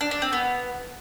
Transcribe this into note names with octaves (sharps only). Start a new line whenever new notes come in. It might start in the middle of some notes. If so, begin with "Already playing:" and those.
D4
D4
C4
B3